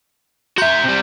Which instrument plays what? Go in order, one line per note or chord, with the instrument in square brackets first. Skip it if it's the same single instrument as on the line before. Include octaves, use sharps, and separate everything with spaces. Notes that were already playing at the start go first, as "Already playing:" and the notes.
[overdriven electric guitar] F#4 E5 [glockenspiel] A#5 C6 G6
[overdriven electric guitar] C3 G3